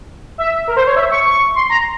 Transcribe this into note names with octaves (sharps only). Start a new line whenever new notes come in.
E5
A#4
C5
C#5
E5
C#6
C#6
C6
A#5